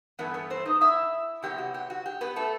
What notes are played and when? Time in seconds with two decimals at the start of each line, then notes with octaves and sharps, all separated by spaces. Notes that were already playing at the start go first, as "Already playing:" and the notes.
0.19 G2 E3 A3 B3 E4 B4
0.34 B3 B4
0.50 C4 C5
0.65 D#4 D#5
0.81 E4 E5
1.42 C3 F#3 B3 G4
1.58 F#4
1.74 G4
1.90 F#4
2.06 G4
2.21 B3 B4
2.36 A3 A4